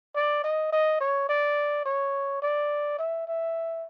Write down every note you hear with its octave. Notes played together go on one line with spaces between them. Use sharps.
D5
D#5
D#5
C#5
D5
C#5
D5
E5
E5